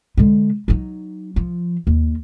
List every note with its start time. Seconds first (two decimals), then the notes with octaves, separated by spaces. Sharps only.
0.17 D3 G#3
0.68 F#3 D#4
1.36 F3
1.87 D#2